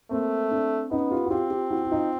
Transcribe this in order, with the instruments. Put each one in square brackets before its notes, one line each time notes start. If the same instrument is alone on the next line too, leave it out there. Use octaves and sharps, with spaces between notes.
[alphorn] A3 [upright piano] A#3 C4
[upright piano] C4 D4
[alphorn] B3 [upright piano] C#4 D#4
[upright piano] F4 G4
F#4
[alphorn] C4 [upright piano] F4 G4
[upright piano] F4 G4
E4 F#4
F#4
D#4 F4